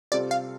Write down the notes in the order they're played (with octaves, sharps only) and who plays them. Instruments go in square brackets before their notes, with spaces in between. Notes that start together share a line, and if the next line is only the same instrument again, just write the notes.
[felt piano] C3 G3 C4 F4 A4 [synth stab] D5
[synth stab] F5